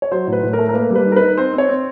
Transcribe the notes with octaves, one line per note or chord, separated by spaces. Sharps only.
C#5
F#3 C5
A2
B4
A2
A#4
A3
A#4
A#3 B4
G3 B4
D#4
A#4
B4
D#4
C4 C5
C4
C#5
C4